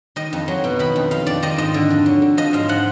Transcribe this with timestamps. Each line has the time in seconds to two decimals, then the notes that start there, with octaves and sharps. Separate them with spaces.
0.16 D#3 D#5
0.33 F2
0.48 F#3
0.64 B2
0.79 D#3 B5
0.96 F2
1.11 D#3 F5
1.26 F2 D5
1.43 D#3 D#5
1.58 G#2 D#5
1.74 D3
1.90 F2
2.06 F#3
2.22 D3
2.37 F3 D#5
2.53 G#2 F5
2.69 F3 F#5